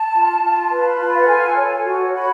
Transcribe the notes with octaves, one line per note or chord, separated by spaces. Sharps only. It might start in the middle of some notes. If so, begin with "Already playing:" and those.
Already playing: A5
F4
F4
B4
F4
F5
F#5
A4 G#5
C#5
F#4
F#4 B5